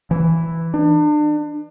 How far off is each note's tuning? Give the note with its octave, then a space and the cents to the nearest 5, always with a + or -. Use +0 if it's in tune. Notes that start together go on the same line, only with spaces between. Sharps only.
E3 +0
D4 +35